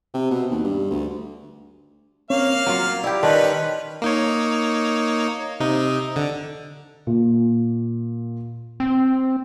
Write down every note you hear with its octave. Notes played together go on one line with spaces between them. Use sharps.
C3
B2
D#2
G2
D2
A#3 C4 C#4 C#5 F5
F#3 F4 A#4 A#5
E4 G4 D5 G5
D#3 C#4 B4 D5 A5 C6
A#3 D#4 C#5
C3 D#4
D3
A#2
C4